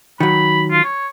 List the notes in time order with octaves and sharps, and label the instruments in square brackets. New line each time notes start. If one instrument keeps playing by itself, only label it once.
[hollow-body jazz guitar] D#3 F#3 [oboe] B5
[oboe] F4
C#5